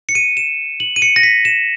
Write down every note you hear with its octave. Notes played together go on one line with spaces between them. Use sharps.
C#7
D#7
E7
F#7
D#7
C#7
A#6
B6
E7